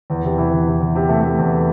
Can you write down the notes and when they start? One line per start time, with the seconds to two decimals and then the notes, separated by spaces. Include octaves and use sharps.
0.10 E2
0.24 C3
0.38 E3
0.52 E2
0.66 C3
0.80 E2
0.95 C3
1.09 A3
1.24 A3
1.38 E2